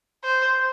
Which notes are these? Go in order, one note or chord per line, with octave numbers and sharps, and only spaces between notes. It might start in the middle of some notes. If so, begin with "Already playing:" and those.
C5